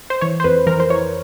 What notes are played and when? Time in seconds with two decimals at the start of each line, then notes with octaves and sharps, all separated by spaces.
0.10 C5
0.21 E3 C#5
0.40 C5
0.44 F2 B4
0.67 E3 A#4
0.80 C5
0.90 E3 C#5